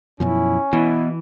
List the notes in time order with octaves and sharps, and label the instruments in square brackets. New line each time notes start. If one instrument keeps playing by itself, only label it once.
[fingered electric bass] F#2 B2 F3 [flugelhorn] C#4 [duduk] E4
[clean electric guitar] B2 [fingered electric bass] E3 [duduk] E4